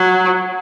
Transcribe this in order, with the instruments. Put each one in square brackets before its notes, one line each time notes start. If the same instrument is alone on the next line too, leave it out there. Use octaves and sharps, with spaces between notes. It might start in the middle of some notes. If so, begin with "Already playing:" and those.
Already playing: [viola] F#3